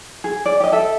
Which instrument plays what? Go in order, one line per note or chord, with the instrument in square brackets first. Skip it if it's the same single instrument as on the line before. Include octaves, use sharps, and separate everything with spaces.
[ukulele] G#4
D5
G4 D#5
A4 E5